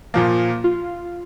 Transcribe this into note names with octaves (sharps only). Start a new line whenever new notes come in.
A#2 F3 A#3
F4